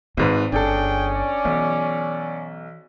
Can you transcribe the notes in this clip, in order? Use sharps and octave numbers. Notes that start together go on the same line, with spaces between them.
G#1 G#2 D#3 B4
G1 C#4 D4 G#4 A4 G5
D5
B1 E3